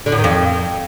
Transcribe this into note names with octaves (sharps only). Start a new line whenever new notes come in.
D3
A2
D#3
F2